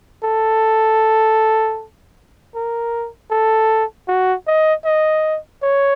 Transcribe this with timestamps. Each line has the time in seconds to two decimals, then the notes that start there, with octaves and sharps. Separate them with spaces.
0.24 A4
2.55 A#4
3.31 A4
4.08 F#4
4.47 D#5
4.85 D#5
5.63 C#5